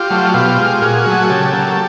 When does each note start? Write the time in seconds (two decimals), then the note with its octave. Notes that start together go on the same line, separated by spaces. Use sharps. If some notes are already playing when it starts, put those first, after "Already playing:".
Already playing: F4 G4
0.10 F#3 A3
0.34 B2 F4 G4
0.58 G#3
0.82 A#2 F#4 G#4
1.06 F#3 A3
1.29 C#3 G4 A4
1.53 F#3 A#3